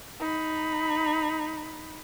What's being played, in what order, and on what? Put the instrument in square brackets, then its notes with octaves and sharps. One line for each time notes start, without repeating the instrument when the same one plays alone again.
[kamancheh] D#4 B5